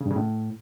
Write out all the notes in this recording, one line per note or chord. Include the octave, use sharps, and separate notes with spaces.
C#3
G2
C#3
A2